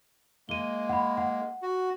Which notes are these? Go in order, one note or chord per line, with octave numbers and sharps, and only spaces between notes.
G#3 A#3 D#7 G7
F#5 B5
F#5
F#4